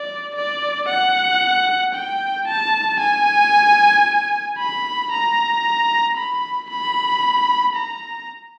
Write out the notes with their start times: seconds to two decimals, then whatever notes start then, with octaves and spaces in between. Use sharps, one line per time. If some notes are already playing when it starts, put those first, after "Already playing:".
Already playing: D5
0.36 D5
0.89 F#5
1.95 G5
2.48 A5
3.00 G#5
4.58 B5
5.12 A#5
6.17 B5
6.70 B5
7.76 A#5